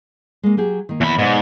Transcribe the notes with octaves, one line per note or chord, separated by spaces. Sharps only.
G#3 A#3
F#3 G4 G#4
D#3 A#3
E2 B5
G#2 B2 D5